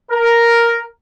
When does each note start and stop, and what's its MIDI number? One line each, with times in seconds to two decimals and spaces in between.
0.12 0.83 70